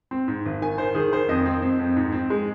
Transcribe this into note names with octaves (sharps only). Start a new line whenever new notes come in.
C4
G#2
G#1
D#3 G#5
D#3 C5
D#3 G#4
D#3 C5
F2 D#5
C4
C4
F2
G#2
C4
G#3